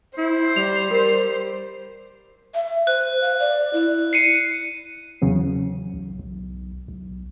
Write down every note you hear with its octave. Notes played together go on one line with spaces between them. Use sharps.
E4 C5
G3 F7
G3 A#4
E5
C5 F#6
F5
D5
E4
C7 C#7 D#7
E2 C#3 F#3
B1
B1
B1